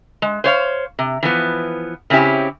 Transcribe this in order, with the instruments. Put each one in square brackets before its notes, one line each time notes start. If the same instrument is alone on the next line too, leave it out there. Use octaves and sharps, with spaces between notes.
[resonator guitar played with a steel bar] G#3
C5 C#5 F5
C3
E3 F3 B3
C#3 C4 C#4 E4 G4